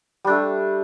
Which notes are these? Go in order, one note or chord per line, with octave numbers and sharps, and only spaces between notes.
G3 A3 D4